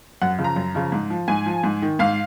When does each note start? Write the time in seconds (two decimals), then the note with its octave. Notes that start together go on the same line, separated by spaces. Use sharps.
0.22 F#2 F#5
0.39 C#3 F3
0.44 A#5
0.56 F#2
0.75 C#3 F3
0.92 G#2
1.10 F3
1.28 G#2 G#5
1.46 F3
1.64 G#2
1.82 D#3
1.99 G#2 F5